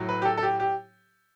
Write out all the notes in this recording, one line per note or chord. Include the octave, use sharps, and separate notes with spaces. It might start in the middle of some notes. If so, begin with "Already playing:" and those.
Already playing: A2 F#3
B4
G4
A4
A4
G4
G4